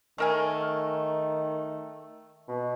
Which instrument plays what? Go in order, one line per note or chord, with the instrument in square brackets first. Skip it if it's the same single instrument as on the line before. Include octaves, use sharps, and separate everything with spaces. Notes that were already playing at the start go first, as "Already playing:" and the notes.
[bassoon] D#3 [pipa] A3 A#4 G#5
[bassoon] B2